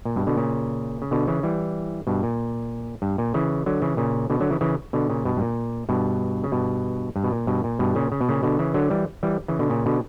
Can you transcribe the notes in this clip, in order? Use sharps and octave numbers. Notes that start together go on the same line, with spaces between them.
A#2
G2 B2
B2 D3
A#2 C#3
C#3
B2 D3
C#3 E3
E3 G3
G2 B2
A#2
G2
A#2
C#3 E3
D3 F#3
C#3 E3
A#2 C#3
B2 D3
D3 F#3
C#3 E3
C#3 E3
B2 D3
A#2 C#3
G2 B2
G2
A#2
G2 B2
C#3
G2 B2
G2
B2
A#2
G2 B2
A#2
G2 B2
A#2 C#3
C#3
B2
A#2 C#3
B2 D3
C#3 E3
D3 F#3
E3 G3
E3 G3
C#3 E3
B2 D3
A#2 C#3
B2 D3